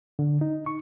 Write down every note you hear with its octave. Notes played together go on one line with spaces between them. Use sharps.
D3
D#4
C#6